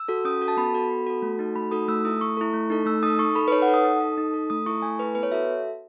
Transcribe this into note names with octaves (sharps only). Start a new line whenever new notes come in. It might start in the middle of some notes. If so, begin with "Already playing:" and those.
Already playing: E6
F#4 A4
C#4 D#6
F#4 A4
A5
B3 B5
F#4 A4
B3
F#4 A4
A3
D#4 F#4 A4
A3 B5
D#4 F#4 A4 D#6
A3 E6
E4 A4 D#6
A3 C#6
E4 A4
A3
D#4 A4
A3 E6
D#4 A4 D#6
D#4 C#6
A4 B5
B4
D#4 C#5
F#5
A4
D#6
D#4
A4
D#4
A4
A3 D#6
E4 A4 C#6
A3 G#5
E4 A4 B4
B3 B4
C#5
F#4 A4 E5